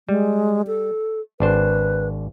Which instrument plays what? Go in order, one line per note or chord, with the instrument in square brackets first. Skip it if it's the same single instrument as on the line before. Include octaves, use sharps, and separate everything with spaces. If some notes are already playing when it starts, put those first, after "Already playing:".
[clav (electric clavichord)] G3 [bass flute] G#3
[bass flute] A4
[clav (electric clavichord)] G#1 D4 C5 [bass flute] B4